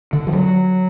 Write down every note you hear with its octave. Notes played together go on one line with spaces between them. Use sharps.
D3
F3
F#3